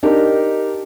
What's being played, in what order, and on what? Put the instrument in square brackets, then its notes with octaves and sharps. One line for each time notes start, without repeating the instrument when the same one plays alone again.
[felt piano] D4 D#4 G4 A#4